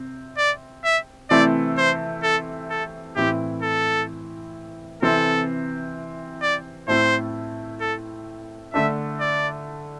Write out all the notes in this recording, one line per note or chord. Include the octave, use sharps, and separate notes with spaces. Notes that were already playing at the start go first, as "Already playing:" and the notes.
Already playing: C3 C4
D5
E5
C3 E3 A3 C4 E4 D5
C5
A4
A4
A2 E3 C4 E4 G4
A4
C3 E3 C4 A4
D5
A2 A3 C4 E4 C5
A4
D3 A3 D4 E5
D5